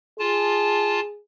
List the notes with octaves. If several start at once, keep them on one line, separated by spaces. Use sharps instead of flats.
F4 G#4 A5